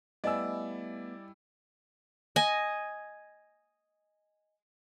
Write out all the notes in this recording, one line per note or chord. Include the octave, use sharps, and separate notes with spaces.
G3 A3 B3 E4 D5 D#5 G#5 E6
D#5 G#5